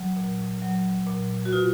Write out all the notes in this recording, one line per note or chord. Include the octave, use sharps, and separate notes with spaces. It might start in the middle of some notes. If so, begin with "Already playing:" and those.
Already playing: F#3
A#2
F#3
A#2
F#4
B2 F4